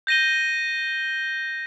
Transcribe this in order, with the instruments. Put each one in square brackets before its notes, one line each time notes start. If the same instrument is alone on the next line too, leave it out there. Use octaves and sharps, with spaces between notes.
[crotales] G6 A#6 D#7 G7